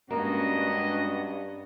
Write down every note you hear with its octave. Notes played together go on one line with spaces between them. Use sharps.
G2 G#3 A#3 B3 C#4 D4 F#4 D#5